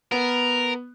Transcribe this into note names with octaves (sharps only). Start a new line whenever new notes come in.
B3 A#4